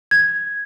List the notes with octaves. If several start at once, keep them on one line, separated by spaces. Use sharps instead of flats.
G#6